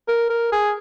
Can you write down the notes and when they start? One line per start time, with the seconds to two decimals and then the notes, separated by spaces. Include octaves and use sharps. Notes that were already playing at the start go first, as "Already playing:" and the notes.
0.08 A#4
0.30 A#4
0.52 G#4